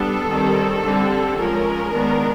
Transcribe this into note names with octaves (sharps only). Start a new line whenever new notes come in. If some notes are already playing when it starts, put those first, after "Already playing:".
Already playing: G3 B3 D4 A4
D#3 G3 C4
D3 G3 C4
F3 G#3 C#4 A#4
D#3 G#3 B3 D4